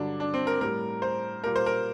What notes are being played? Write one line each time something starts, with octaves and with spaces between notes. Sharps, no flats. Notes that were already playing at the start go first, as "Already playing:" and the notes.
Already playing: G2 D3 F#3 D4
D4
C4
A#4
A2 G3 A#4
C5
A#2 G3 A#4
C5
A#4